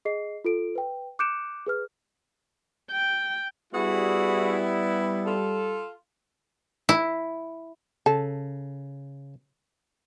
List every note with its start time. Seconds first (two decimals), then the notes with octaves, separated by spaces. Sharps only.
0.05 G#4 D#5 C7
0.45 F4 A4 D7
0.75 B4 G5
1.19 D6 F#6 G6 C#7 D7 E7
1.67 G#4 B4 F6
2.91 G5
3.73 G3 B3 E4 F#4 G#4
5.25 F4 A4
6.89 E4
8.06 C#3 A4